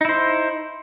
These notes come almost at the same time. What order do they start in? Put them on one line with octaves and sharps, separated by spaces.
D#4 E4 C5